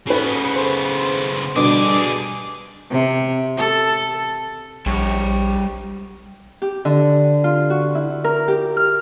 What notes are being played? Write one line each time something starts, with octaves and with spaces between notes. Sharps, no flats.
C#3 B3 A4 B4
C5
B2 D3 G3 D4 G#4 D6
C3
A4
A#1 G3 C#5
G4
D3
F4
F#4
E4
A#4
G4
F6